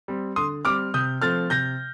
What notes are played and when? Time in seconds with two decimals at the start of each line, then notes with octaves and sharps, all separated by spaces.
0.08 G3 C4
0.36 D3 C6 D#6
0.65 G3 C4 D6 F6
0.94 C3 D#6 G6
1.21 F3 A3 C4 F6 A6
1.50 C3 G6 A#6